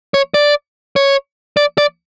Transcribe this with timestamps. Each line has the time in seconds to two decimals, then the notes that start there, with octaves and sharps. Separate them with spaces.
0.14 C#5
0.34 D5
0.96 C#5
1.57 D5
1.78 D5